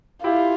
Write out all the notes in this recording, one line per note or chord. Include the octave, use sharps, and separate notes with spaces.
E4 F4 G4